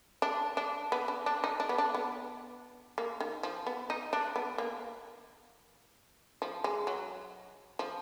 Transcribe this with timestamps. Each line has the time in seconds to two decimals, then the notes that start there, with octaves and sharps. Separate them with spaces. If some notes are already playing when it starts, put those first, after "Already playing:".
0.22 D4
0.57 D4
0.92 B3
1.08 D4
1.26 D4
1.44 D#4
1.60 D4
1.69 B3
1.78 D4
1.94 B3
2.98 A#3
3.20 D#3
3.43 F3
3.67 B3
3.90 D#4
4.13 D4
4.36 B3
4.58 A#3
6.42 F3
6.64 G#3
6.87 F#3
7.79 F3